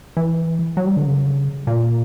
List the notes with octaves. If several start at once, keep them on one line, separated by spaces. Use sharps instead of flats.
E3
F#3
G3
D3
C#3
A#2